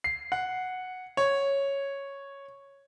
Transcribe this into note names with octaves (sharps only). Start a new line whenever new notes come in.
C7
F#5
C#5